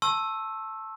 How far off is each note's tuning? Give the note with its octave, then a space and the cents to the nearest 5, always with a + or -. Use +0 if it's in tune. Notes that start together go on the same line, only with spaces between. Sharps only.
A5 +0 C#6 -45 E6 +0